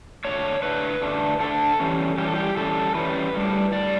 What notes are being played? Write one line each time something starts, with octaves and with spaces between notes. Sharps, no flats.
D3 A3 D4 C#5
D3 A3 D4 B4
D3 A3 D4
D3 A3 D4 A4
E3 G3 C#4
E3 G3 C#4 G4
A4
G4
E3 G3 C#4 A4
E3 G3 C#4 B4
A2 G3 D4
A2 G3 D4 D5